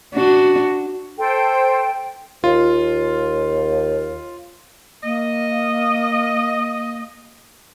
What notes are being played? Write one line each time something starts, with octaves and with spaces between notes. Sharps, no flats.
D4 F#4
A4 C5 G5
D#2 F4
A#3 D#5